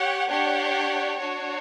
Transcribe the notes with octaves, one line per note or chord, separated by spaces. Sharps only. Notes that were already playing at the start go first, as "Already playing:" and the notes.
Already playing: G4 C#5 F#5
D4 G4 C#5 F#5
D4 F#4 C#5